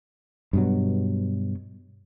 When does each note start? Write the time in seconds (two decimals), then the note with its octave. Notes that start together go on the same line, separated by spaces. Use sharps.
0.53 G2 B2 F#3